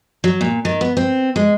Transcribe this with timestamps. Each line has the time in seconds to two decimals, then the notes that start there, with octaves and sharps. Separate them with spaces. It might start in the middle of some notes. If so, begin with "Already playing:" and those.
0.24 F#3
0.41 A#2
0.65 D#3
0.81 B3
0.97 C4
1.36 G#3